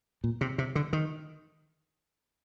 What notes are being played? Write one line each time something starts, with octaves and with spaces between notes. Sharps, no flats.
A#2
C3
C3
D3
D#3